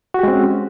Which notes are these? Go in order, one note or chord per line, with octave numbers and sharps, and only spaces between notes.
G#3 C4 C#4 F#4 G4